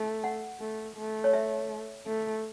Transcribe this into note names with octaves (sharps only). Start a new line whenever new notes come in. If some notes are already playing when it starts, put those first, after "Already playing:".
Already playing: A3
F#5
A3
A3
C#5
E5
A3